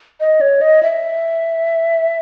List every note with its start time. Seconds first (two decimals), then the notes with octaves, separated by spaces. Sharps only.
0.20 D#5
0.41 C#5
0.61 D#5
0.83 E5